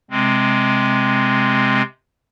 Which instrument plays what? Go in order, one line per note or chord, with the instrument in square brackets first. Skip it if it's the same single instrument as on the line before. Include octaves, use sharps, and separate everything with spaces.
[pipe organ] C3 G#3 C4